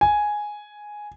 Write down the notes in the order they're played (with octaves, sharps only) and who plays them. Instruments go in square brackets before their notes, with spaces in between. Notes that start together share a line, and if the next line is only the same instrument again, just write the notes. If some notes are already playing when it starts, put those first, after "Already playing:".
[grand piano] G#5